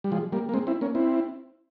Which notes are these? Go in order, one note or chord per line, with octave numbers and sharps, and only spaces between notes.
G3
F3 G#3
G3 A#3
A#3
G#3 C4
C4 E4
A#3 C#4
C4 E4